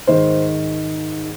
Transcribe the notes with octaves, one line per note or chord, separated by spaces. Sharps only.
G#2 D#3 C5